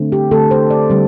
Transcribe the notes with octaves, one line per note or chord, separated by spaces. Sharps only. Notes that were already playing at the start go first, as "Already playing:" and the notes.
Already playing: D3 A3 C4
G4
D3 A3 C4 A4
C5
D5
D3 G3 C4